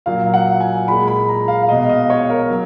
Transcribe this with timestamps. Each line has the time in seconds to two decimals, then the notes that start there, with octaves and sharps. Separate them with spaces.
0.06 A#2 F#3 F5
0.34 F#5
0.60 G#5
0.87 A#2 G#3 B5
1.08 B5
1.28 A#5
1.48 F5
1.63 F5
1.69 B2 G#3 D#5
1.84 F5
1.89 D#5
2.10 C#5
2.30 A#4
2.50 F#3